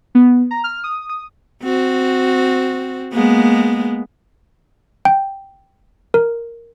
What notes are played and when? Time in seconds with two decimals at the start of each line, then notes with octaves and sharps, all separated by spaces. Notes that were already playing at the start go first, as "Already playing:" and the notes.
0.15 B3
0.51 A#5
0.64 F6
0.84 D#6
1.10 D#6
1.63 C4 F#4
3.13 G#3 A#3 B3
5.05 G5
6.14 A#4